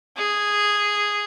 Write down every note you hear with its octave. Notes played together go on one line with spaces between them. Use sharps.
G#4